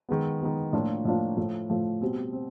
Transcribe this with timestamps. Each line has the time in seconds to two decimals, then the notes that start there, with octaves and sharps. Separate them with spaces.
0.09 D#3 G#3 B3
0.41 D#3 G#3 B3
0.73 A2 F3 A#3 D4 F4
1.05 A2 F3 A#3 D4 F4
1.37 A2 F3 A3
1.69 A2 F3 A3
2.01 B2 G3 C4
2.33 C4